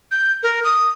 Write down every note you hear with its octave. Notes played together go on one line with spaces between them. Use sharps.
G6
A#4
D#6